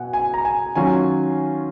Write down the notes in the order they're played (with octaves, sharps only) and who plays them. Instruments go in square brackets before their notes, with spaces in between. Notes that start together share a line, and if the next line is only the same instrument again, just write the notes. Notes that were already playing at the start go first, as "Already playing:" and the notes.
Already playing: [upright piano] B2 [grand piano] F#5 G#5
[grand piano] G#5
A#5
G#5
[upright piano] D#3 F#3 C#4 F4 [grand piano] G#5